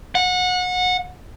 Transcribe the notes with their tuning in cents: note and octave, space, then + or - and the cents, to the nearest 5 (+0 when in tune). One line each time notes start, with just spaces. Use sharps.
F#5 -25